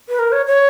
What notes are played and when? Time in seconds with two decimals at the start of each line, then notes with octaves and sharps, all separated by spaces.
0.09 B4
0.19 A#4
0.32 C#5
0.47 C#5